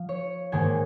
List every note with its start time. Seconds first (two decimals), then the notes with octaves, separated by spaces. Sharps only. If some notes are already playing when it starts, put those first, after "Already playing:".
Already playing: F3 F5
0.09 C#5
0.52 G#2 D#3 A#3 D#4 G#5